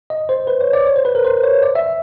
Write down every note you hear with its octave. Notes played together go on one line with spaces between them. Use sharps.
D#5
C5
B4
C#5
D5
C#5
C5
B4
A#4
C5
C#5
D5
E5